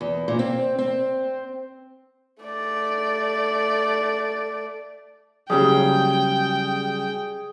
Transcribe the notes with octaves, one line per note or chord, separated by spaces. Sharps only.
E2
A#2
C4
C4
A3 D5
C#3 F#3 G3 G#4 G5